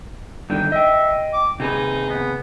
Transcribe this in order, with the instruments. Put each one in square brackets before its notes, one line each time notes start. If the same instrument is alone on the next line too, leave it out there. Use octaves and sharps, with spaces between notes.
[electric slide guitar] G2 D3 D#3 [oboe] G5
[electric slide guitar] D#5 G5 [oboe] E5
[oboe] D6
[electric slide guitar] C3 G#4 B4 [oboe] D#4
[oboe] B3